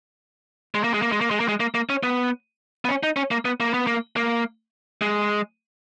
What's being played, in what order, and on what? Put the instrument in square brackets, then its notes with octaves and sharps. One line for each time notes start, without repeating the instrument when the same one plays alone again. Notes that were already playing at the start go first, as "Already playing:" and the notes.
[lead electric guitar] G#3
A#3
G#3
A#3
G#3
A#3
G#3
A#3
G#3
A#3
A#3
C#4
B3
B3
C#4
D#4
C#4
A#3
B3
A#3
B3
A#3
A#3
G#3